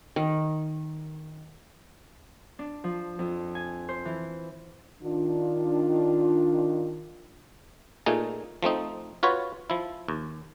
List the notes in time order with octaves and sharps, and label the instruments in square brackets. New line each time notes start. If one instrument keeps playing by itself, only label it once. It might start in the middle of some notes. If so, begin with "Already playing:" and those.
[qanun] D#3
[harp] D4
F3
F2
G#5
C5
E3
[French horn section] D#3 D4 F4
[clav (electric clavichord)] A#2 A3 D#4 G#4
F3 A3 C4 D#4
F4 F#4 B4 C#5
F3 E4
D#2